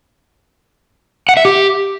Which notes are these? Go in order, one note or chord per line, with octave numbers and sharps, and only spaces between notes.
F#5
E5
G4